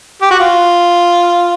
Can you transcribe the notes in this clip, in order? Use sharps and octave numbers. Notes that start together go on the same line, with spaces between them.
G4
F#4
F4